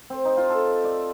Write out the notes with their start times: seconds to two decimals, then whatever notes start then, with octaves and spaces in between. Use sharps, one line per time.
0.10 C4
0.25 D#4
0.37 F4
0.50 A4
0.84 D5